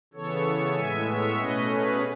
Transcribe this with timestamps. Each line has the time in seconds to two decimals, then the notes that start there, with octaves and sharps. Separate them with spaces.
0.13 C#3 E3 B3 A4 C#5
0.76 A2 G#3 B3 E5 G#5
1.07 C#5 E5
1.39 B2 A3 C#4 B4 D#5
1.70 G#4 B4